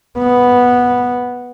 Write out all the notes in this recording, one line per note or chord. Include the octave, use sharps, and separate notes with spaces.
B3